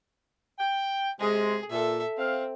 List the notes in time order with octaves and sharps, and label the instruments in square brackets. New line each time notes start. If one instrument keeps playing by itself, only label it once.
[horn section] G5
[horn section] C3 G#3 [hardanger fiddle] G#4
[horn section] A#2 [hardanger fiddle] A4 E5
[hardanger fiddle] C4 [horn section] F5